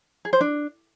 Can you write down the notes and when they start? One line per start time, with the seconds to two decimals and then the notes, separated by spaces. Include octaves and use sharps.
0.25 G#4
0.33 C5
0.41 D4